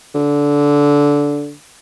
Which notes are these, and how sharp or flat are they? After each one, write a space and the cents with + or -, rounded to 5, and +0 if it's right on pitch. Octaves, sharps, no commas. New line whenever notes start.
D3 -15